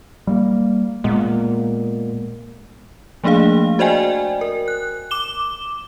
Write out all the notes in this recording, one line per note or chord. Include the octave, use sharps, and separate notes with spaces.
G3 A3 A#3
A#2 G#3 A#3 B3
F3 A3 A#3 D4 G#4 F5
F#4 C5 D5 D#5 G5 G#5
A#4
F#6
D6 E7 G7